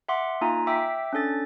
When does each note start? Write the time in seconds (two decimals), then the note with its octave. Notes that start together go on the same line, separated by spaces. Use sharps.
0.08 E5 F#5 C6 D6
0.41 A#3 D#4 F4 G#5 A#5
0.67 E5 G5 D6 E6 B6
1.13 C#4 D4 A4 A6